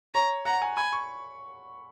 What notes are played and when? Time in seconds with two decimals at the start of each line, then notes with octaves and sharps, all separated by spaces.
0.15 C#5 A#5
0.45 F#5 A#5
0.62 G#5
0.77 G#5 B5
0.93 C#6